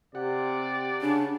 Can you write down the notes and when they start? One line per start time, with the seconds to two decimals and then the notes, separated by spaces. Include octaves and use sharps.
0.15 C3 G4 D5 F#5
1.01 C#3 D4